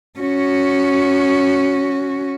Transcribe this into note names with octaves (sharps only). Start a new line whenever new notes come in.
C#4 F#4